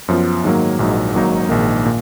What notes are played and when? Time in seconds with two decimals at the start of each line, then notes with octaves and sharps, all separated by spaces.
0.08 F#2 F3 B3 F4
0.44 G#2 D#3 F#3 A#3
0.79 A#1 G#2 F#3 A#3 D#4
1.15 G#1 G#2 F#3 A#3 D#4
1.49 A#1 G#2 D#3 A#3
1.86 A#2